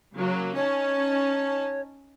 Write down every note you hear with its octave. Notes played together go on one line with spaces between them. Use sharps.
C#3 F#3 A#3
C#4 D#4 C#5 A5